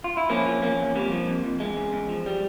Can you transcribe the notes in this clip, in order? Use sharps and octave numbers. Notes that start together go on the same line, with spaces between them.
F4
E4
F3 A#3 C#4
F3
E2 A#3 C#4
E2
F2 G3 A#3
F3
F2
F2
E2 G#3
C#3
E2
F3
G3